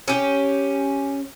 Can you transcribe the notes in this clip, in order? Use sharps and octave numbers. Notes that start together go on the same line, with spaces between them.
C#4 G4